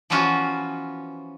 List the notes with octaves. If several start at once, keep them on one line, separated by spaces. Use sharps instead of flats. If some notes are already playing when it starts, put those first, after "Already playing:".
E3 F3 B3 C#4 F4 F#4